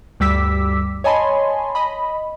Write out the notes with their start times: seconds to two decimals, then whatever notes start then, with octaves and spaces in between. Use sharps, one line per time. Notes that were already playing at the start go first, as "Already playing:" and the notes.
0.20 D2 G2 G3 D6 E6 B6
1.04 C#5 D#5 G#5 A5 B5 C6
1.75 D#5 B5